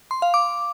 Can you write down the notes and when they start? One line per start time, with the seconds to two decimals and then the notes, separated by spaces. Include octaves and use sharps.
0.11 C6
0.22 F5
0.34 D6